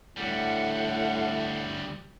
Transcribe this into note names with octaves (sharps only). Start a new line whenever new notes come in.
D2 A2 G3 F#5